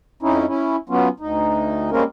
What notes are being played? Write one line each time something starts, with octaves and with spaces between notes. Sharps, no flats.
F2 C#4 D#4 E4
C#4 E4
F#3 B3 C#4 F4
D2 D#4
G3 G#3 A#3 C4 C#4 A#4